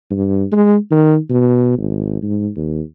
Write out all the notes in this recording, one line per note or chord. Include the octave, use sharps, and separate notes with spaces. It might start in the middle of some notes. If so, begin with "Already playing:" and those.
G2
G#3
D#3
B2
G#1
G#2
D#2